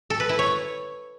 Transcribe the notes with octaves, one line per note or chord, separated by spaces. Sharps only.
A4
B4
E4
C#5